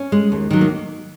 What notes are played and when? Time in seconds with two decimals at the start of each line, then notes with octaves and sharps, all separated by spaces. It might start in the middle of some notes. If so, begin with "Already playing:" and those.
Already playing: C#4
0.12 G#3
0.32 D#2
0.51 D#3 F#3
0.61 A#3